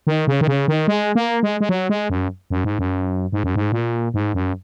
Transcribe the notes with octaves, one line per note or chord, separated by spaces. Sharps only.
D#3
C#3
D#3
C#3
D#3
G#3
A#3
G#3
G#3
F#3
G#3
F#2
F#2
G#2
F#2
G#2
F#2
G#2
A#2
G#2
F#2